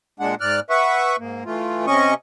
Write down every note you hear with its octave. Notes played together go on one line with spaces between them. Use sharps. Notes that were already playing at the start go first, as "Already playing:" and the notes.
A#2 G#3 D4 F#5
G#2 D5 F6 F#6
B4 E5 F#5 C#6
G#2 A#3
E3 A3 F4
C3 C#4 D#5 C#6